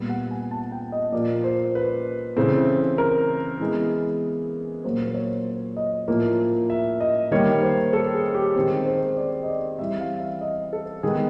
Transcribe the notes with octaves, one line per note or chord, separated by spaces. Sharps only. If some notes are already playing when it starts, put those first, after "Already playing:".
Already playing: A#2 G3 B3
F#5
G#5
A5
G5
D#5
A#2 F3 A#3 D5
C5
B4
C#3 E3 A3 C4
A#4
E3 G#3 B3
A#2 F#3 A#3 C5
C5
C#5
D#5
A2 F3 A#3
E5
D#5
D#3 G3 A#3 C#5
C5
A4
G#4
G4
D#3 G#3 C4 G#4
C5
D5
D#5
D5
E3 G3 C4 E5
F5
E5
D#5
A4
D#3 G#3 B3 G#4